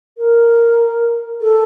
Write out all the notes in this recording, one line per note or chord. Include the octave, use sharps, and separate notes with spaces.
A#4
A4